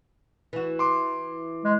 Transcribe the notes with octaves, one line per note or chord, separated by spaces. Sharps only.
E3 F#4
C6 D6
G#3